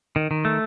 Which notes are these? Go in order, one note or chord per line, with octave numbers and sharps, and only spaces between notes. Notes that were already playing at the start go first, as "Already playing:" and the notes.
D#3
D#3
A3